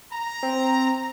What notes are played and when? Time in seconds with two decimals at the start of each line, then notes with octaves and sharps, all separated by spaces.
0.11 A#5
0.43 C4